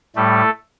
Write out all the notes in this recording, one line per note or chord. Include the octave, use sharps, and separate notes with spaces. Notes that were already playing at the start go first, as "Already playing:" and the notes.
A2 G3 A3 A4